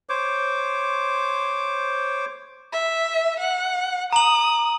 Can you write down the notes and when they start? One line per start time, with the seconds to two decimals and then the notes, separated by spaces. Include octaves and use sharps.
0.09 C5 C#5 D6
2.72 E5
3.40 F#5
4.13 A#5 D#6 F#7